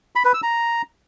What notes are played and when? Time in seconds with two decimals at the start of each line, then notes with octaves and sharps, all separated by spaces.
0.16 B5
0.25 B4
0.34 E6
0.43 A#5